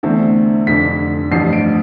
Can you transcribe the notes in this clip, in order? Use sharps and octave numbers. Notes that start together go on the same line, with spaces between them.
E2 D3 A3 C4
F1 F2 D3 B6
A1 G2 F3 C4 C7
D7